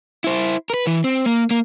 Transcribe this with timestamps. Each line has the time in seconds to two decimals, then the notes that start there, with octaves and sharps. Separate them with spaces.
0.24 E4 C5
0.70 A#4 B4
0.87 E3
1.04 C4
1.26 A#3
1.51 A#3